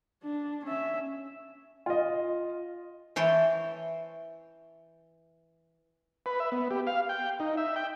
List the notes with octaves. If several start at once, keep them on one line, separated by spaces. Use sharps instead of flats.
D4
C#4 E5
F4 D#5
E3 C5 C#5 G5 A5
B4
E5
B3
G4
F5
G5
D#4
E5
G5